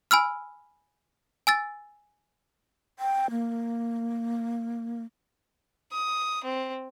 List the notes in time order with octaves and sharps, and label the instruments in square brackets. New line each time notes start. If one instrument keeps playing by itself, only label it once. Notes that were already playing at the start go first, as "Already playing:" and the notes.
[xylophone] G#5 B5 E6 F6
G#5 E6 A6
[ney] G5
A#3
[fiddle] D#6
C4